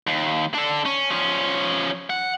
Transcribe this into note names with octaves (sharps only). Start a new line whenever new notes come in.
D#2
D4 A4
C#4
F3 C#4
F#5